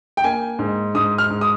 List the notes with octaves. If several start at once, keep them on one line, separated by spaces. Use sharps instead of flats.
G5
A#3 G#5
G#2
G#2 D#6
F6
G#2
D#6